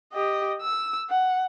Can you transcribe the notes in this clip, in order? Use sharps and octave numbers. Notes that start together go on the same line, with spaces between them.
G4 D#5
E6
F#5